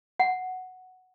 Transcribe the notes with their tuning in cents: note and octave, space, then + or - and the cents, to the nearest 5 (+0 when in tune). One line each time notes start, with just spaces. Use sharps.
F#5 +0